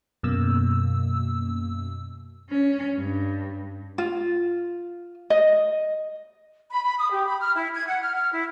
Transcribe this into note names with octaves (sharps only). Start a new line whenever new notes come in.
F#2 B2 A#3 E6
C#4
G2
F4
D#5
B5
B5
D#6
G4
B5
F6
E4
G#6
F#5
F6
F6
E4